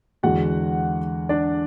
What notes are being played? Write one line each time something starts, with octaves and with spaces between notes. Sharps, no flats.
E2 D3 G#3 F#4 F#5
D4 D5